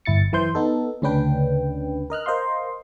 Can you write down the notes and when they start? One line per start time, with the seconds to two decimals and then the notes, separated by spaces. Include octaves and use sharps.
0.05 G1 E4 A6 C#7
0.33 F#2 E3 E4 C5 C6 G6
0.55 B3 D#4 A4
1.02 D2 C#3 C#4 D4 B4 G5
2.10 A#4 D#5 F6 F#6
2.26 A#4 C5 D#5 F5 C6